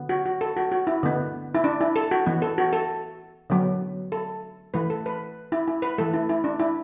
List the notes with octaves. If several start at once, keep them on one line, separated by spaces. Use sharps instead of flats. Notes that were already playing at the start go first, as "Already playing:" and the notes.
Already playing: D3 B3
F#4
F#4
A4
F#4
F#4
E4
D3 B3
E4
D4
E4
A4
F#4
E3 B3
A4
F#4
A4
D3 F#3 B3
A4
E3 A3 B4
A4
B4
E4
E4
B4
E3 A3 A4
E4
E4
D4
E4